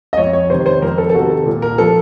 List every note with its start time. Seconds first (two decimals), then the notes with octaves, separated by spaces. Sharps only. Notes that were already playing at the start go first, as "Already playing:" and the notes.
0.13 D#5
0.17 F2 C#5
0.33 C#5
0.50 C3 D#3 C5
0.66 C5
0.82 F2 A#4
0.98 A4
1.09 A4
1.14 C3 D#3 F#4
1.30 A4
1.46 A#2
1.62 A#4
1.78 F3 A4